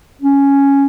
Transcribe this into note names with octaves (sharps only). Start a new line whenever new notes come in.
C#4